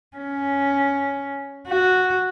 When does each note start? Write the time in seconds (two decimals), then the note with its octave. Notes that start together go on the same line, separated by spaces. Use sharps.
0.17 C#4
1.68 F#4